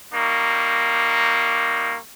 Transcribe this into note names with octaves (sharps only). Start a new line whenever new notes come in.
G3 A#3 D#4 C#6